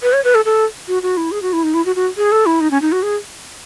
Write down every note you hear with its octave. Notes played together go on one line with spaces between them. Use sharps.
B4
C#5
B4
A4
A4
F#4
F#4
E4
G#4
F#4
E4
D#4
E4
F#4
F#4
G#4
A4
E4
D#4
C#4
D#4
F#4
G#4